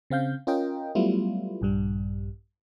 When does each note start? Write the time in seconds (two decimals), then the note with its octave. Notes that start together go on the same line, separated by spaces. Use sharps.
0.10 C#3 C4 F5 G6
0.47 C#4 F4 A#4 D#5 G5
0.95 F#3 G3 A3 B3 E4 F4
1.62 A#1 G2 G3